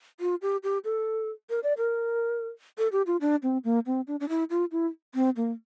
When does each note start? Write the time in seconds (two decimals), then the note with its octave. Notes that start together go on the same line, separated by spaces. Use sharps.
0.20 F4
0.42 G4
0.63 G4
0.84 A4
1.50 A#4
1.63 D5
1.78 A#4
2.78 A4
2.92 G4
3.07 F4
3.21 D4
3.43 C4
3.64 A#3
3.86 C4
4.07 D4
4.20 D4
4.29 E4
4.50 F4
4.72 E4
5.15 C4
5.36 A#3